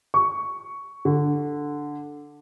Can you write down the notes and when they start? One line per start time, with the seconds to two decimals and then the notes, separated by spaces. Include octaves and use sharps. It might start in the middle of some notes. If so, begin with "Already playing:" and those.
0.14 C#6
1.05 D3